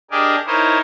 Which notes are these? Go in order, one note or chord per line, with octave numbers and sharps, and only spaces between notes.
D4 G4 G#4 A#4 D5 D#5
D#4 E4 A#4 C5 C#5 D#5